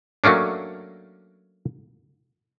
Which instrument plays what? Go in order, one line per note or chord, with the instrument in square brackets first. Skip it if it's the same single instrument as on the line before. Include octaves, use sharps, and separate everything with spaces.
[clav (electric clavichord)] F#3 A3 A#3 C#4 D4